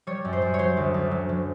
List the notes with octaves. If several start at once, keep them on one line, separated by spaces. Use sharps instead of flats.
G3 C#5
F#2
C5
F#2
C#5
F#3 C5
D2
D2
F#3
F#3